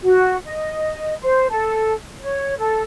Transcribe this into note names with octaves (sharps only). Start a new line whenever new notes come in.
F#4
D#5
C5
A4
C#5
A4